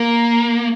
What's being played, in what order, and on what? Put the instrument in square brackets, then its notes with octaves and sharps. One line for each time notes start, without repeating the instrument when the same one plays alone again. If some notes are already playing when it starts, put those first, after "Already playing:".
Already playing: [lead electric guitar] A#3